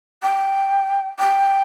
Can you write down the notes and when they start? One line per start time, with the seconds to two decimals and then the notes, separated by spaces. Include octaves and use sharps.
0.22 G5
1.19 G5